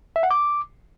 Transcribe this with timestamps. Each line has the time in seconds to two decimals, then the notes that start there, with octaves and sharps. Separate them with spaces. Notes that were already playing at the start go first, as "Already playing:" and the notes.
0.16 E5
0.23 F#5
0.31 D6